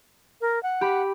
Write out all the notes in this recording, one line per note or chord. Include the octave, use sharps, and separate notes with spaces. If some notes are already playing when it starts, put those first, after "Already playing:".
A#4
F#5
G4 B5